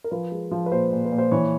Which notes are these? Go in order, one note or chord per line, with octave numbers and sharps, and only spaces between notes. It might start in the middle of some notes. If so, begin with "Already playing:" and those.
A#4
F3 B4
G#3
F3
B4
A#2 C5
A#2
B4
A#2
C5
E3 C#5